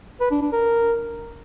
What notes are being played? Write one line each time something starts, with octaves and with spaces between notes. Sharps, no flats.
B4
D4
D4
A#4